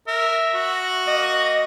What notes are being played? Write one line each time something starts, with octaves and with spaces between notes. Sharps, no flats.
A#4 E5
F#4
A#3 D#5